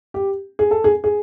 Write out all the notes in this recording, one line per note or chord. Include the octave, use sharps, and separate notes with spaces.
G4
G#4
A4
G#4
G#4